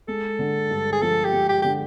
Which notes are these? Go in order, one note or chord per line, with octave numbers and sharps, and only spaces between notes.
G#3 A4
D3
G2
G#4
F3 A4
G4
G#3
G4
D3 G4